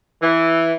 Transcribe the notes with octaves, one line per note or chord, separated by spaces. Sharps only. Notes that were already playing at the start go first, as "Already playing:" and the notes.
E3